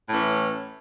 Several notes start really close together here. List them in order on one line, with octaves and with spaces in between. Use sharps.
A2 C#4 E3